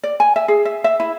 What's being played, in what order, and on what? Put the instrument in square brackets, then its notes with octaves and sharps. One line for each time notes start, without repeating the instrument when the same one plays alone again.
[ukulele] D5
G#5
E5
G#4
E5
E5
E4